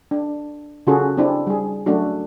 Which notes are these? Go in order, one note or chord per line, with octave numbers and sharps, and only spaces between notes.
D4
C#3 C#4 F4 F#4 G#4 A4
C4 D4 E4
G3 G#4
F#3 A3 C#4 D4 F#4